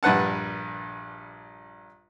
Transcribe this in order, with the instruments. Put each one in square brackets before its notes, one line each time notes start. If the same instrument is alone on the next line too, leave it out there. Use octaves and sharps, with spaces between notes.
[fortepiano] A#1 G2 B4 F#5 A5